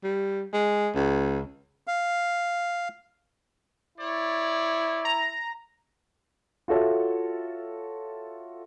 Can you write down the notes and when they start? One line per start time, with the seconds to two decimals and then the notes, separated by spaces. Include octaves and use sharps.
0.04 G3
0.53 G#3
0.95 C#2
1.87 F5
3.98 E4 C#5 D5
5.05 A#5
6.68 F4 F#4 A4 C#5 E5